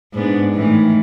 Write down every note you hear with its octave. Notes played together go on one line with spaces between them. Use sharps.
G#2 B3 D4
A2 D#3 E3